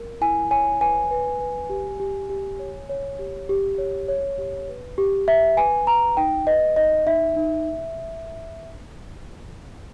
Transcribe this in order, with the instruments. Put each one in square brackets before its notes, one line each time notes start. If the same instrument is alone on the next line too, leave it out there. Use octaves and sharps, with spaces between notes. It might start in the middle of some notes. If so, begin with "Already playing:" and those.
Already playing: [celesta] A#4
E4 G#5
C#5 G#5
B4 G#5
B4
B4
G4
G4
G4
C#5
C#5
G4
G4
C#5
C#5
G4
B4
G4
G4 E5
B4 G#5
B4 A#5
D#4 G5
B4 D#5
D#4 D#5
D#4 E5
D#4